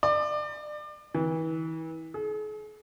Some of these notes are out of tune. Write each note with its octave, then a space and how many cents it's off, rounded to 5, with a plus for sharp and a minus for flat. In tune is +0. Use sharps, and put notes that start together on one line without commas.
D5 +30
E3 -35
G#4 +45